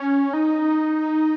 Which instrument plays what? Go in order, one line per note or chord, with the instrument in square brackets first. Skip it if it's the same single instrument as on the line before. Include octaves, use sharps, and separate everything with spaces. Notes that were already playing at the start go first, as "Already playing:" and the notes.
Already playing: [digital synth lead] C#4
D#4